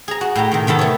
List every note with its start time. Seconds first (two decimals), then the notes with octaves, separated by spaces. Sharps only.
0.08 G#4 A#5
0.21 F#4
0.35 A2 G4 A#5
0.51 C3 D#3
0.67 C3 D#3 B3 A4
0.79 A3 C#5